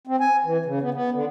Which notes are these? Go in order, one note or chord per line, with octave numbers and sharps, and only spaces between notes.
C4
G#5
E3
C#3
B3
B3
D3